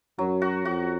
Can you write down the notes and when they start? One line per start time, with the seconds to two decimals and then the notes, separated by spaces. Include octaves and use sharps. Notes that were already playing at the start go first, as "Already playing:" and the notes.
0.19 F#2 F#3
0.42 F#4
0.65 F2 F#4